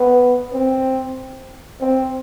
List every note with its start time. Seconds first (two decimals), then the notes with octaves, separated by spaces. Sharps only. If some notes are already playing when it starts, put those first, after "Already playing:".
Already playing: B3
0.54 C4
1.81 C4